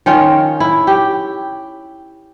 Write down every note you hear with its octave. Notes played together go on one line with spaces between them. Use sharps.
D#3 C#4 F4
E4
G4